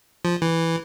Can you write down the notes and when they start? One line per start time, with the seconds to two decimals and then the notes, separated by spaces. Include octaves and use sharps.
0.25 F3
0.42 E3